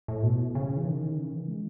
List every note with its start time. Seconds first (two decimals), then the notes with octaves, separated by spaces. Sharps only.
0.08 A2
0.23 B2
0.55 C#3
0.77 E3
0.86 D#3
1.16 C#3
1.32 E3
1.48 G#3